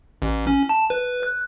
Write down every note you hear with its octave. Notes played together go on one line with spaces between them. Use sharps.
A1
C#4
A5
B4
F#6